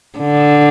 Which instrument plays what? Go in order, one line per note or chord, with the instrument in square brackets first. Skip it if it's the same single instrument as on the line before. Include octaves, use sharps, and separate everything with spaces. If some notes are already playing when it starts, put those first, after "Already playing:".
[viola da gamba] D3